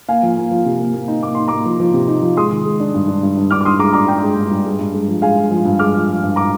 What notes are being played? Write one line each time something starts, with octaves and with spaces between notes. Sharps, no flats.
A#3 F5 G#5
F3
A#3
F3
C3
A#3
A#3
D#4
A#3 D6
D#4 C6
A#3 A#5 D6
F3
F3
C3
D#4
F3
G#3 C6 D#6
D#3
G#3
D4
G2
D4
G2
G2
D4 D6 F6
D6
G2 C6 D#6
G#3 A#5 D6
D4 A#5 D6
D4 G5 A#5
G#3
G2
G2
G#3
G2
G#3
F3
G#3 F5 G#5
G#3
F3
G2
G#3 D6 F6
F3
F3
G2
A#5 D6